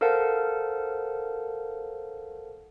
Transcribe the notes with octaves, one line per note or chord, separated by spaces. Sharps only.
A4 A#4 C5 F5 F#5 A5